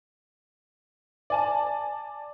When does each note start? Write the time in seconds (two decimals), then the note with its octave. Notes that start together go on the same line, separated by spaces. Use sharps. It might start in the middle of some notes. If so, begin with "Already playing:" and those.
1.30 D5 G#5 A5